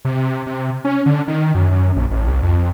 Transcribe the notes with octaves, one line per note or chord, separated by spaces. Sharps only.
C3
C3
C#4
D3
D#3
F#2
F#2
A#1
A1
C2
F2